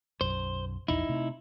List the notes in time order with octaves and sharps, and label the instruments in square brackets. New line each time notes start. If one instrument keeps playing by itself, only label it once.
[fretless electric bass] B1 F#2 [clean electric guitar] C5
[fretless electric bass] E1 A#1 E2 [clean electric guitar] D#4 E4
[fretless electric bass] C3 A3